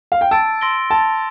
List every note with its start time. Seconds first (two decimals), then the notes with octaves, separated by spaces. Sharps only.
0.12 F5
0.21 G5
0.31 A5 E6 A6 D7
0.61 C6 E6 A#6 D7 G7
0.90 A5 E6 A6 D7 F7